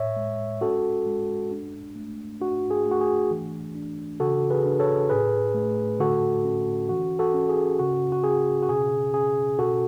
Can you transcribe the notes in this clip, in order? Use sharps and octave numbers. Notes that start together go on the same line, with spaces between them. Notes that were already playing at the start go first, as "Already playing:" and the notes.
Already playing: A2 C#5 E5
G#3
C#4 F#4 A4
G#3
D4
A3
D4 F#4
G#4
A3
F#4
G#4
E3
D4
C#3 F#4 A4
G#4 B4
D4
A4 C#5
A2 G#4 B4
A3
D3 F#4 A4
C#4
E3 F#4
F#4 A4
C#4
G#4
C#3 F#4
F#4
C#4 G#4
F#4
B2 G#4
C#4 G#4
B2 F#4 A4